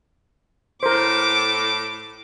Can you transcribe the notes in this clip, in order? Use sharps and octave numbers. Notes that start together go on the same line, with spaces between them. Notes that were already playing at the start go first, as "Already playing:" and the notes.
A2 A#4 C5 D6